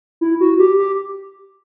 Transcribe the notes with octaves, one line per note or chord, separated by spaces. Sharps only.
E4
F#4
G4
G4